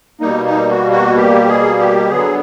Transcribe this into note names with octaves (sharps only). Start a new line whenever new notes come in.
B2 G3 A#3 D#4
D#4
F#4
F#4
G4
G#4
G4
D3 F#3 B3 G#4